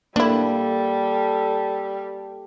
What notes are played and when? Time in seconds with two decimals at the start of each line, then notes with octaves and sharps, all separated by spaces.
0.16 G3 A#3 D4 E4 A4